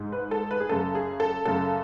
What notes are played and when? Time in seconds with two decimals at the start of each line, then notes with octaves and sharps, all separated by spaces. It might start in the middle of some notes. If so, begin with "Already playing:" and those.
Already playing: G#2
0.12 B4
0.31 A4
0.51 B4
0.60 G#4
0.69 F#2 C#3 A4
0.95 G#4
1.20 A4
1.45 F#2 C#3 A4